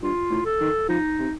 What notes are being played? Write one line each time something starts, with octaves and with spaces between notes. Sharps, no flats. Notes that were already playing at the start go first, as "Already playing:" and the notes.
G2 F4
A2
A4
D#3
F3 D#4
C3